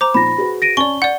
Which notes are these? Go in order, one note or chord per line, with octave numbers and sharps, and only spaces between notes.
C5 A#5 D6
A#2 F3 D#4 B5 A#6
F#4 G#4 B4
A#6 D7 D#7
C#4 D5 G#5 A5 C#6 G7
D5 F#5 G6